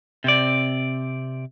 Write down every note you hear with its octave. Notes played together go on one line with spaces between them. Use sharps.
C3 C4 D5